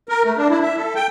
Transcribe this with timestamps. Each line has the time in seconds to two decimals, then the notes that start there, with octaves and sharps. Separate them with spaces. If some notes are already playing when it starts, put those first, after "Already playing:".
0.09 A#4
0.25 A3
0.37 D4
0.50 E4
0.62 E5
0.77 A4
0.95 G5